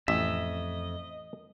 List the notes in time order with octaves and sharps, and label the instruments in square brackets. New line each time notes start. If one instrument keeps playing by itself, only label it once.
[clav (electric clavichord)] A1 [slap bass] F2 [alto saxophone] D#5 [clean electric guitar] E5